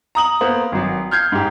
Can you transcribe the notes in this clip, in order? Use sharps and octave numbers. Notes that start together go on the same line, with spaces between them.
A#5 D#6 F#7
A#3 B3 C5
G#1 F#3
F6 G6 G#6 C7
G#2 G4